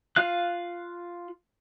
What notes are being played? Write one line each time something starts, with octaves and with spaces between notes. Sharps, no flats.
F4 F5 F#6